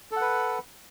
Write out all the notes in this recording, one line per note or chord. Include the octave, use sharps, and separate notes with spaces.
A4 B4 F#5